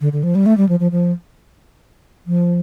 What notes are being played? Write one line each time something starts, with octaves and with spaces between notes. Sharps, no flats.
D3
D3
F3
G3
A3
G3
F3
F3
F3
F3